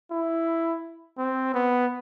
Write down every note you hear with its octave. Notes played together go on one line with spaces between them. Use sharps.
E4
C4
B3